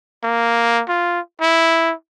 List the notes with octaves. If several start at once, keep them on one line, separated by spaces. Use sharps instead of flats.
A#3
F4
E4